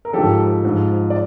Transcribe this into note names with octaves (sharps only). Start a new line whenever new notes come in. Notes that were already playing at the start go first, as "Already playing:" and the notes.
A#4
G#2 F3 G4 A4
G#2 F3
D5